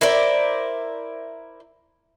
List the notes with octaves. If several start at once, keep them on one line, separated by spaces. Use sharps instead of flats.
E4 A#4 C5 D5